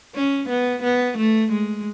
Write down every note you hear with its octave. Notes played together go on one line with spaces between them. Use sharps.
C#4
B3
B3
A3
G#3